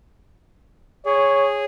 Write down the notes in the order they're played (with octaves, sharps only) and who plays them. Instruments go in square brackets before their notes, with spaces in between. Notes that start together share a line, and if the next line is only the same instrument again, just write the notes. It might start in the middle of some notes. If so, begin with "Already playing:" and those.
[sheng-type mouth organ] G#4 [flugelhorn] C#5